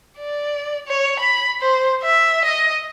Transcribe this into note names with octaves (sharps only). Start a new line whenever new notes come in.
D5
C#5
B5
C5
E5
D#5